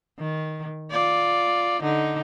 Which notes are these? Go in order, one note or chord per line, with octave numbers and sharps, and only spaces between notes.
D#3
F4 D5
D3 D#4